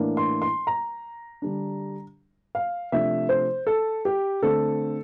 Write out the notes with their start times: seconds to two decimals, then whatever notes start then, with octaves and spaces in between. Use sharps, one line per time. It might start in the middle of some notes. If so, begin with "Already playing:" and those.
Already playing: A2 E3 A#3 D4
0.17 C6
0.42 C6
0.67 A#5
1.42 D3 G3 D4
2.55 F5
2.92 C3 F3 A3 D4 E5
3.29 C5
3.67 A4
4.05 G4
4.42 D3 A3 C4 A4